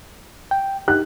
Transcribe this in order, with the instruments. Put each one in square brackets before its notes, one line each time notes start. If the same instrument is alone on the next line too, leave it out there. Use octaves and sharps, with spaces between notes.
[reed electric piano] G5
[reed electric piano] D#4 G4 [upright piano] F#6